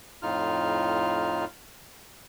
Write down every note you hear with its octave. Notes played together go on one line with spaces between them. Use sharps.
F2 A2 D#4 F4 F6